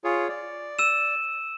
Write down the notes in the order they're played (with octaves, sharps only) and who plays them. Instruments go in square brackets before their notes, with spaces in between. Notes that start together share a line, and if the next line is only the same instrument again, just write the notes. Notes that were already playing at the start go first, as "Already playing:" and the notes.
[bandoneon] F4 G#4 C#5
D5
[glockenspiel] E6 D#7 E7